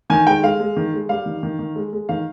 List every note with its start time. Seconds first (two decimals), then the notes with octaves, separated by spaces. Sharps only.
0.10 D#3 G#5
0.27 G#3 G5
0.43 G#3 F5
0.60 G#3
0.76 D#3
0.94 G#3
1.09 G3 F5
1.26 D#3
1.43 D#3
1.59 D#3
1.76 G#3
1.93 G#3
2.09 D#3 F5